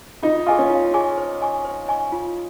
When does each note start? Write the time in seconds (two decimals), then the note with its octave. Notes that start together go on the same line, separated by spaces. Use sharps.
0.23 D#4 F4
0.47 F4 G#4 D#5 G#5 C#6
0.59 C#4
0.70 F4
0.94 G#4 D#5 G#5 C#6
1.17 C5
1.41 D#5 G#5 C#6
1.65 C5
1.88 D#5 G#5 C#6
2.12 F4